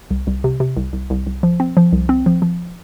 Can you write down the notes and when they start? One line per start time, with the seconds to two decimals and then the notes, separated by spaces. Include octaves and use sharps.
0.11 C2
0.27 C2
0.44 C3
0.60 C3
0.77 C2
0.93 C2
1.10 C2
1.27 C2
1.43 F3
1.60 C4
1.77 F3
1.93 C2
2.09 C4
2.26 F3
2.42 F3